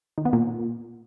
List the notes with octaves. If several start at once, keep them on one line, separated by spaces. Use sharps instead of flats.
D#3
B3
A#2